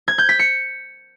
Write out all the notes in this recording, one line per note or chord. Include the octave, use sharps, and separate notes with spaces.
G#6
G6
B6
C#7